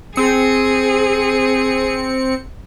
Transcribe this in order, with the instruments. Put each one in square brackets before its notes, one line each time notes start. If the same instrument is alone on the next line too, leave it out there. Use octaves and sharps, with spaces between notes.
[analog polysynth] C4 C#7 [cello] G#4